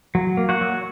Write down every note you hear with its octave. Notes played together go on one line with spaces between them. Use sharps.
F#3
A#3
F#4 F#5
F#3